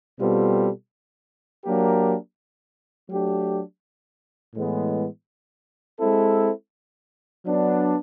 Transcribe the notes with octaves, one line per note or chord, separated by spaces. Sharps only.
B2 G3 C4 F4 A4
F#3 A#3 D4 G4 A#4
F#3 A3 D4 G4
A2 E3 G#3 B3
G#3 C4 E4 A4
F#3 B3 D4